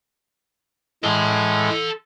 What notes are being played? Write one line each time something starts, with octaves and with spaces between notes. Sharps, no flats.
A2 G#3 A4 C6